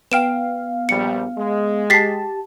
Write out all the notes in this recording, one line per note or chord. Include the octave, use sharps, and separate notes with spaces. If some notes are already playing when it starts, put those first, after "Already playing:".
B3 F5 G5 D7 E7
A#1 G3 C#7
G#3
G4 A5 A6 B6 C7